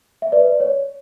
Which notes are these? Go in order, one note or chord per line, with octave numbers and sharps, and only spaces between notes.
E5
B4 D5
B4
C#5